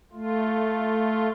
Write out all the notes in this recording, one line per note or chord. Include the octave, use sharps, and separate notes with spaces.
A3 F4